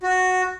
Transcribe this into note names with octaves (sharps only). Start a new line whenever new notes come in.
F#4